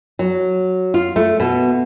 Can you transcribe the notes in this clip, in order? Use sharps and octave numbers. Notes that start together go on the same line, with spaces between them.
F#3
F4
A3
B2